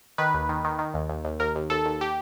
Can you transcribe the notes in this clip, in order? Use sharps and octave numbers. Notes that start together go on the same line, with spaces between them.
D#3 B4
D#2
D#3
D#3
D#3
D#2
D#2
D#2
D#2 A#4
D#2
D#2 A4
D#2
G4